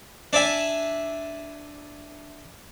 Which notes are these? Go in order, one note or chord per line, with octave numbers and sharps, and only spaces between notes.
D4 D5 E5 G#5